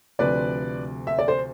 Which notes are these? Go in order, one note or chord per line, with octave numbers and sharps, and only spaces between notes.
D2 C3 F3 B4 D5
E5
D5
C5